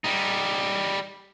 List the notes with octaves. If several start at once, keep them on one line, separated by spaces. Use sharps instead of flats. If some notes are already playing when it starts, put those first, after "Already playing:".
G3 D#4